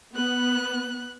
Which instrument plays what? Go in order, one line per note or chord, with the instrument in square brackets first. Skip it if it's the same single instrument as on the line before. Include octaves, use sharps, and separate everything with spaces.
[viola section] B3 [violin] F#6